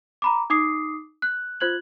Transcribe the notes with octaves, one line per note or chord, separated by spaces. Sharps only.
A#5 B5 D6
D#4 D6 D#6 C7
F#6
F4 C5 F#6 G#6 F#7